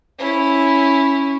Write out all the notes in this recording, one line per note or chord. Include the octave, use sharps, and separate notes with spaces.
C#4 E4